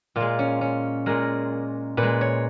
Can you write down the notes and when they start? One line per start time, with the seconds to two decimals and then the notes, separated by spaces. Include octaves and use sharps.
0.16 A#2 G#3 F4
0.39 C#4
0.61 C#4
1.06 A#2 G#3 A#4
1.97 A#2 B4
2.03 G#3
2.21 C#5